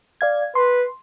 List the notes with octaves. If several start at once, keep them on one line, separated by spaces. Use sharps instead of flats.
D5 F5 G#6
B4 C6